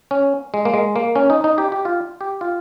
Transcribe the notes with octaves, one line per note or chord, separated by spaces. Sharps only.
C#4
G#3
A#3
G#3
A#3
C#4
D#4
D#4
G4
G4
F4
G4
F4